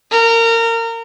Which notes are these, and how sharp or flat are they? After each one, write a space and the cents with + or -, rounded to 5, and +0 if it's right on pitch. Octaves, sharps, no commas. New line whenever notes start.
A#4 -25